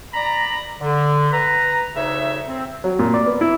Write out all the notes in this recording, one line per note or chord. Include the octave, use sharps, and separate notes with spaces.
D5 A#5 B5
D3
B4 A#5
D2 C#3 D#4 C#5 E5
C4
F#3
A#2
D5
B3
E4